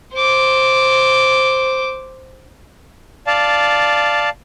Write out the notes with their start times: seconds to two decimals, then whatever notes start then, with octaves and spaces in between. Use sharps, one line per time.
0.13 C5 D6
3.27 D5 F5 A5